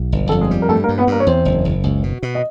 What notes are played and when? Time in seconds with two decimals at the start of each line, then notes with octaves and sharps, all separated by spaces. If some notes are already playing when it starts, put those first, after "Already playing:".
Already playing: B1
0.12 G1
0.29 F2 A4
0.41 G#3 G#4
0.51 G3
0.62 A#4
0.69 G2 A3 A4
0.84 A#3 A#4
0.89 G2
0.98 B3 B4
1.07 G2 A#3 A#4
1.20 C#5
1.27 E2 C4 C5
1.45 F#1
1.65 F#1
1.84 C#2
2.03 B2
2.23 B2
2.35 D#5